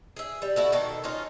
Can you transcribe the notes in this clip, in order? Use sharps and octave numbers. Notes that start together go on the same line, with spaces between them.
G#4 E5
G3
E4 F#4 A4
B2 D#3 A4
C#4 D#4 F4